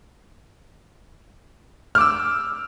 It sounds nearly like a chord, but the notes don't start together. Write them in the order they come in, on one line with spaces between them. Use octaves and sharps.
F6 D6 E6